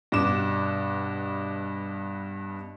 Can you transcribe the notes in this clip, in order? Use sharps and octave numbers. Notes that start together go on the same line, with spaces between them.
G2 B2 D6 E7